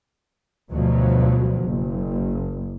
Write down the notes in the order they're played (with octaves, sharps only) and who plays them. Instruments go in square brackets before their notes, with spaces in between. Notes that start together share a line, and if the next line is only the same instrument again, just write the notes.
[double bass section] D2 G2 B2 F3 F#3
F#1